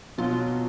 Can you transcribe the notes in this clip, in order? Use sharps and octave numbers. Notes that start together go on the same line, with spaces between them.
B2 F#3 F4